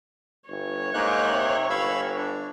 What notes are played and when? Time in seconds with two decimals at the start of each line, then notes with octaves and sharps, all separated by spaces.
0.49 G1 C#5
0.94 G#2 A#3 D#4 F#6
1.31 C3
1.70 G1 F5 B5 E6
2.18 D4